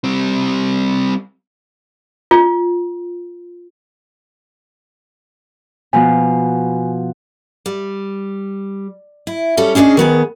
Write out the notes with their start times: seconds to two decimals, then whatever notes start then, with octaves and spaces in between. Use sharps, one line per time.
0.04 G3 C4
2.31 F4
5.93 B2 F3 B3 G#5
7.66 G3
9.27 E4
9.57 G3 C#4 A4
9.75 C#4 D4 G#4 B4 D#5
9.97 D#3 B3 G#4